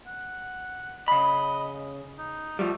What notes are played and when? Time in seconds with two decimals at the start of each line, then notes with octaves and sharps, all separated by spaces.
0.07 F#5
1.08 C#3 D#5 B5
2.18 D#4
2.59 F3 G3 A3